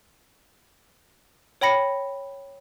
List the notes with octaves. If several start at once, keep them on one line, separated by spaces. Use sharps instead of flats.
C#5 G5 B5 A#6 C#7